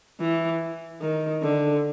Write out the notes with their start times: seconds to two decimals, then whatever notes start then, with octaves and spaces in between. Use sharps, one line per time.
0.21 E3
1.02 D#3
1.43 D3